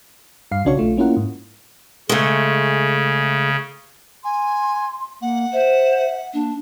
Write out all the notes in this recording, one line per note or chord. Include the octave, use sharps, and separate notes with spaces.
G2 F5 C7
B1 C#3 D4 F#4 C#5 C#6
A#1 A3 F4
A#3 C#4 E4 F4 A#4 F#5
G#2
C#3 G#3 A3
G#5 C6
A#3 F#5
C5 E5
A#3 D4